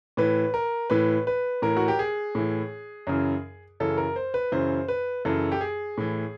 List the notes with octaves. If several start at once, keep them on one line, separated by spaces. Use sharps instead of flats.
A2 E3 B4
A#4
A2 E3 B4
B4
A2 E3 A#4
F#4
G4
G#4
A2 E3
F#2 C#3 E3
F#2 C#3 E3 A4
A#4
C5
B4
F#2 C#3 E3 C5
B4
F#2 C#3 E3 A4
G4
G#4
A2 E3